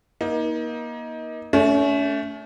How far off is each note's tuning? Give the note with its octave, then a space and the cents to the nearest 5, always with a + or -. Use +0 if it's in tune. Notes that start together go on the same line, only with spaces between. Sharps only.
A#3 +35 D#4 +25
A3 +0 C#4 +40